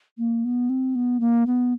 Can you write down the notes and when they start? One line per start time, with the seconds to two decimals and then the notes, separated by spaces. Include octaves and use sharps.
0.18 A#3
0.45 B3
0.69 C4
0.95 B3
1.20 A#3
1.46 B3